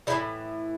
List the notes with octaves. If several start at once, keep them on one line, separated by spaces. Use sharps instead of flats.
A2 E3 G3 E4